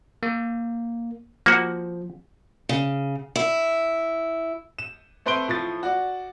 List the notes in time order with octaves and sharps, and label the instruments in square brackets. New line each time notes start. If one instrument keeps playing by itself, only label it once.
[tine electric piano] A#3
[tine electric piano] F3 [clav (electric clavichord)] A#3 F#4
[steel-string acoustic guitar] C#3
E4
[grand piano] E7
A3 C4 B4 C6 D7 G7
A2 F3 A6
F#4 D5